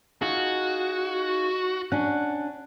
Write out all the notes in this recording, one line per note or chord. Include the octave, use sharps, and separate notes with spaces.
D#4 F4 F#4 G#4
C#4 D4 F#5